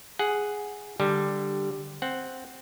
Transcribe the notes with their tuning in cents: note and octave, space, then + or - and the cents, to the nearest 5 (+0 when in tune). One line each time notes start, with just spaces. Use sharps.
G#4 +0 F#5 +0
D3 +5 G3 +5 G4 +0
C4 +0 F#5 +0